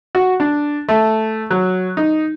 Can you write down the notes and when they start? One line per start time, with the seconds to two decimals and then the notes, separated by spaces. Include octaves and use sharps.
0.15 F#4
0.40 D4
0.89 A3
1.50 F#3
1.97 D#4